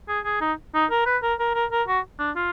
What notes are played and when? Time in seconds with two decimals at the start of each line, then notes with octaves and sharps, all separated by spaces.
0.08 G#4
0.25 G#4
0.41 D#4
0.74 D#4
0.91 A#4
1.06 B4
1.23 A#4
1.39 A#4
1.54 A#4
1.72 A#4
1.88 F#4
2.19 D4
2.36 F4